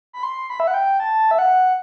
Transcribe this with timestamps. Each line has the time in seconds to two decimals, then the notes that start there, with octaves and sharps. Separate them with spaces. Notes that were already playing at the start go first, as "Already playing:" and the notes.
0.13 B5
0.23 C6
0.50 B5
0.60 E5
0.67 F#5
0.74 G5
1.00 A5
1.31 E5
1.39 F#5